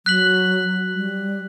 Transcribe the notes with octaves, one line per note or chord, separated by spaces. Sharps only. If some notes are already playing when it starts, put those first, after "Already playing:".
F#3 F#6 B6 F#7
G3